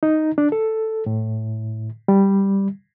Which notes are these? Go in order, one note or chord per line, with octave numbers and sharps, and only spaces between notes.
D#4
D4
A4
A2
G3